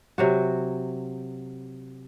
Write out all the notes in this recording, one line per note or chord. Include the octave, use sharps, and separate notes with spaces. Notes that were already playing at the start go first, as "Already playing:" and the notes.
C3 F#3 F#4